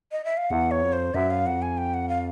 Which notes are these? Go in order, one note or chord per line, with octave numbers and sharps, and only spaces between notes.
D#5
E5
F5
E2 F#5
C#5
F2
C5
F#2 E5
F5
F2 F#5
G#5
G5
F#5
F5